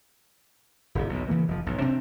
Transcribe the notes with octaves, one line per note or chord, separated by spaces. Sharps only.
D1 G1 C3
B1 E2 B2
C#3 E3 G#3 A#3
F1 F3
B1 G#2
C3 C4 D4